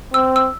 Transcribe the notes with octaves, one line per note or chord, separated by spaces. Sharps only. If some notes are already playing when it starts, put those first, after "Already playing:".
C4 E6
E6